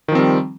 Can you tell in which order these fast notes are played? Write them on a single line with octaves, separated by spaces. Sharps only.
D#3 F3 C4 G3